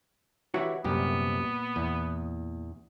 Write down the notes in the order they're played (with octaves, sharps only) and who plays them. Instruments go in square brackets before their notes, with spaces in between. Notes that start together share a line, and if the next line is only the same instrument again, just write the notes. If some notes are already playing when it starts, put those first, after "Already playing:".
[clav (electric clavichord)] E3 E4 G4 [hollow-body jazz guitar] F#4 C#5 F#5
[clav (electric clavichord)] C2 F#2 G4 [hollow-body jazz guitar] A#2 [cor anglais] B3
[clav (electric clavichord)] E2